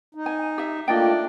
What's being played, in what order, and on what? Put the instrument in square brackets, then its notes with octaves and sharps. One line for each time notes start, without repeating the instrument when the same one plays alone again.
[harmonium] D#4
[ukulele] G#5
G4 E5
[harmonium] A3 A#3 [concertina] D4 [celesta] F4 A6 D7 [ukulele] D#5 G5